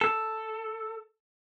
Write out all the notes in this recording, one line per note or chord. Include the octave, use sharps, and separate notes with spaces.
A4